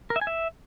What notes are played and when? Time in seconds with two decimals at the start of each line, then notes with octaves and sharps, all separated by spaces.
0.10 A#4
0.16 E5
0.21 G#5
0.27 E5